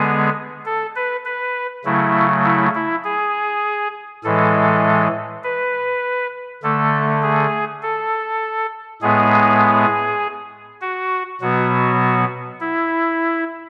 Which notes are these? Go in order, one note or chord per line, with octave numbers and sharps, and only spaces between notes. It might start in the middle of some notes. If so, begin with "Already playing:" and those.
Already playing: D3 G#3 B3 G#4
A4
B4
B4
C#3 F#3 A3 E4
E4
E4
G#4
A2 E3 G#3 A4
B4
D3 A3 A4
G#4
A4
A2 G#3 B3 G#4
F#4
B2 F#3 B3 F#4
E4